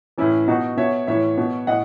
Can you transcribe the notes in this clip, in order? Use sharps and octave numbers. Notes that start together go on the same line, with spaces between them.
A2 E3 C#4 E4
B2 D#4 F#4
B2 C#5 E5
A2 E3 C#5 E5
B2
A2 D#5 F#5